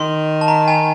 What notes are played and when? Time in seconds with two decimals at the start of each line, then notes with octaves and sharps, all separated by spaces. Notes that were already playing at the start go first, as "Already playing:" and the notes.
Already playing: D#3 C6
0.41 A5
0.48 A#5
0.68 G#5